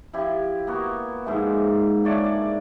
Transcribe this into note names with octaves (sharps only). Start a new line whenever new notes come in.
F3 E4 G4
A#3 B3 F#4
G#2 F3 G#3 E5
D4 C#5 D5 E5
D5